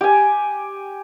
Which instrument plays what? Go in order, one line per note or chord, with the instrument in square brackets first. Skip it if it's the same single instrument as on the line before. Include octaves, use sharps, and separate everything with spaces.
[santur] G4 G#5